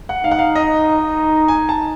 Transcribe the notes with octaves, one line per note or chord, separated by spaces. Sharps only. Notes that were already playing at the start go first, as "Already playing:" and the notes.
F#5
D#4 F5
F#5
F5
D#5
G#5
A5